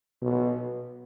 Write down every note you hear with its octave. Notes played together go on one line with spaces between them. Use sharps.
B2